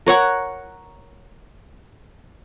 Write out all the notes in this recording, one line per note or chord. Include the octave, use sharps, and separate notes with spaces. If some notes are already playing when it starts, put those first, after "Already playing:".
A#4 C#5 F#5 C#6